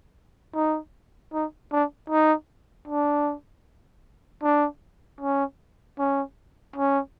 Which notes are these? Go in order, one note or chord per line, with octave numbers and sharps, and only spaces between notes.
D#4
D#4
D4
D#4
D4
D4
C#4
C#4
C#4